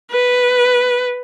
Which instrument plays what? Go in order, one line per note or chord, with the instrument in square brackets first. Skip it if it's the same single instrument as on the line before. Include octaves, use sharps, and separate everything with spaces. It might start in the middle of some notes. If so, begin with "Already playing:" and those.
[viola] B4